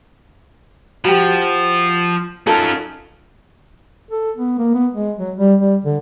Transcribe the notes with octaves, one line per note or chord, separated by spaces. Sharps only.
F3 F#4 G4
C#4 D#4 F4 A4 A#4
A4
B3
A#3
B3
G#3
F#3
G3
G3
D3